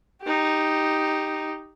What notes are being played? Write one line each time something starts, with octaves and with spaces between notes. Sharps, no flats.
D#4 G4